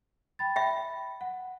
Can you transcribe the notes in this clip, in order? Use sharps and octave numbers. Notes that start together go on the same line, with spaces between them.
G5 B5 A6
E5 G5 B5
F#5